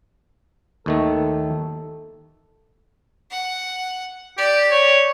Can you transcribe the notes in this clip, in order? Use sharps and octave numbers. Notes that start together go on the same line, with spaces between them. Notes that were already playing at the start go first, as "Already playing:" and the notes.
D#2 D#3 A3 A4
F#5
G4 D5
C#5